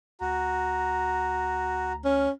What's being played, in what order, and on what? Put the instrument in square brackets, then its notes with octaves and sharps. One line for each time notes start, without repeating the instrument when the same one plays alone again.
[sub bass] D2 [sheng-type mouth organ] F#4 [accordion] A#5
[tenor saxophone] C#4 [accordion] F6